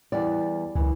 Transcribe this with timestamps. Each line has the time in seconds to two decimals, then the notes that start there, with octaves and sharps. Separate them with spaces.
0.12 E2 G3 D5
0.75 C#2 E3